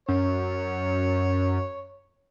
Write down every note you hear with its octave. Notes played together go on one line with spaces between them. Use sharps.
F#2 C#5